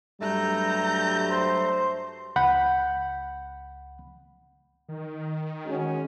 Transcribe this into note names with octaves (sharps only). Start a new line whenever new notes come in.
G2 F#3 G3 A3 A#5 G6
C5
C#2 F#5 B5 G6
D#3
G#3 C#4 F#4